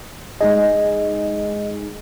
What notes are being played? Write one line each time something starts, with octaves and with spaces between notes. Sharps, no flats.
G#3 D#4 G#4 D#5